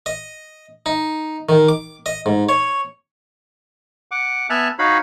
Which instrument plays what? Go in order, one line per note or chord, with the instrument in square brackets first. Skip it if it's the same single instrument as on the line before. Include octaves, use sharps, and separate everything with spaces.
[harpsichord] D#5
D#4
D#3
D6
D#5
G#2
C#5
[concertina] F#5 D6
B3 E5 G#5 A5 F6 F#6
D#4 F#4 C#5 F5 B5